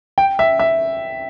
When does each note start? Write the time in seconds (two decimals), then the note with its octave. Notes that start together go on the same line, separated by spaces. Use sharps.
0.18 G5
0.39 E5
0.60 E5